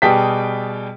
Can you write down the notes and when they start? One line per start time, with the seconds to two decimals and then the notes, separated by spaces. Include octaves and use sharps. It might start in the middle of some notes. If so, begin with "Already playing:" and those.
0.02 B2 G3 G#4 G5 A5 B6